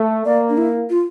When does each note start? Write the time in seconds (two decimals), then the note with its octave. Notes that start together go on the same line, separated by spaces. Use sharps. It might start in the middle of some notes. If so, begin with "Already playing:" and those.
Already playing: A3
0.25 A#3 D5
0.49 D4
0.58 E4
0.90 F4